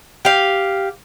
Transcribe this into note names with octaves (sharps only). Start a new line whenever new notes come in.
G4 F5